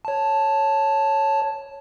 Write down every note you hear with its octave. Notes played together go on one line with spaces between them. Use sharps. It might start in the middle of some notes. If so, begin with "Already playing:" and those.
C#5 A5